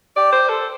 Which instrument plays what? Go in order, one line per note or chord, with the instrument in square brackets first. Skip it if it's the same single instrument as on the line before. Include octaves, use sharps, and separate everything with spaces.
[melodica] G4 [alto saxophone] D5
[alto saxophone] C5
A4